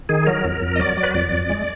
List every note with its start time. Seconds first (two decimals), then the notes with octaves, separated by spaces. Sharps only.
0.09 D#3 G#4
0.26 F#3 A#4
0.44 F2
0.61 F2
0.76 D#5
0.79 F#3 D5
0.97 F#3
1.03 B4
1.14 F2 D5
1.32 F2
1.50 G#3